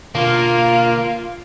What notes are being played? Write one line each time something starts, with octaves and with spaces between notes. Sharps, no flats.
B2 D3 A#3 D4 F4